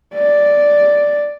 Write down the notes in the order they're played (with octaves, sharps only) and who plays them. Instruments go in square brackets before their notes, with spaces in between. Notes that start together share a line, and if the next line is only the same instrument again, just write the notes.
[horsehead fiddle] D5